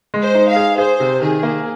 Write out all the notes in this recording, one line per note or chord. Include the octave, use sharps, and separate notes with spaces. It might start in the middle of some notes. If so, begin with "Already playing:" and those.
G#3
C5
D#4
F5
G#4
G#4 C5
C3
D#3 G#4
A#3